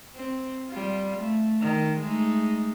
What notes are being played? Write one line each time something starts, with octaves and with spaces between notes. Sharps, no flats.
C4
G3 F4
A3
D#3
G#3 A3 D#4